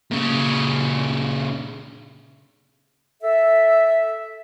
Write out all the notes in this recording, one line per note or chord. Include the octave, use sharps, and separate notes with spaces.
A#2 C#3
A4 E5